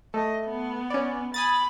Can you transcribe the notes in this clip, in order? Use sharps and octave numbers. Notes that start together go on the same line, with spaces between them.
A3 D#5
B3
C#4 D5
G#5 B5 D#6 A6